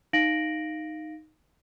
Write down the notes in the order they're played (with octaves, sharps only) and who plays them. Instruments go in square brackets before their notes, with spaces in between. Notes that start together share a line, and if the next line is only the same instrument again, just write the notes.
[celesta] D#4 F5 A#6 D7 F#7